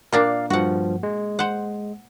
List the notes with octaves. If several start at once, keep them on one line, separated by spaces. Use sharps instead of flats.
A#2 A#3 D4 A#4 D5 F5
G2 F3 F#4 F#5
G#3
C5 F#5